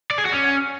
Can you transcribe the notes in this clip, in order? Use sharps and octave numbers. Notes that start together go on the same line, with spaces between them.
D5
G#4
F#4
C#4